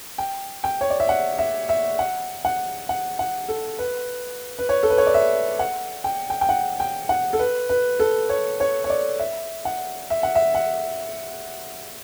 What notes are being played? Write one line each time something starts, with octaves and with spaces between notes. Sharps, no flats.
G5
G5
C#5
D5
E5
F#5
E5
E5
F#5
F#5
F#5
F#5
A4
B4
B4
C#5
A4
B4
C#5
D5
E5
F#5
G5
G5
G5
F#5
G5
F#5
A4
B4
B4
A4
C#5
C#5
C#5
D5
E5
F#5
E5
F#5
E5
F#5